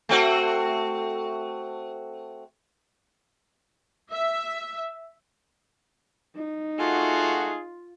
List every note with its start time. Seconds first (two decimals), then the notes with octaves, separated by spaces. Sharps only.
0.09 A3 C4 F#4
4.12 E5
6.36 D#4
6.79 A3 F4 F#4 G#4